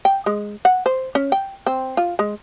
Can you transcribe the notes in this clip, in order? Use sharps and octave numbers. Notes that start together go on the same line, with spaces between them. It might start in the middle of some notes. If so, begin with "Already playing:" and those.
G5
G#3
F#5
C5
C#4
G5
C4
F4
G#3